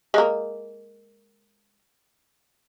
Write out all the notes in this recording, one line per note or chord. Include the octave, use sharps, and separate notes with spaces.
G#3 A#3